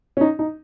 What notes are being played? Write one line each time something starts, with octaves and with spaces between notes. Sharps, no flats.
C#4
D#4
D#4